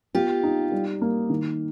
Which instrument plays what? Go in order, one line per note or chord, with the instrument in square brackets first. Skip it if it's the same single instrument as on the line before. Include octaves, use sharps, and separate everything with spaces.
[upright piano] B3 [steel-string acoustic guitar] F4 G4
[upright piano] D#4
G3
A#3
D#3